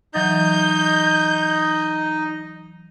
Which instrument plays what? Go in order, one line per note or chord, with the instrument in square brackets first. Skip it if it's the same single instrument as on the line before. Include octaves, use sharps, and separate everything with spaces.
[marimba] E3 F#3 A6 [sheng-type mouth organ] D#4 D#5 [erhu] G6